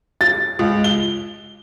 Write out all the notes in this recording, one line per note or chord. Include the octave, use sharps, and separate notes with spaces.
A6
C#2
G7